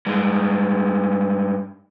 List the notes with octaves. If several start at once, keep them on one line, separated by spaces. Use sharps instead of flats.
G2 G#3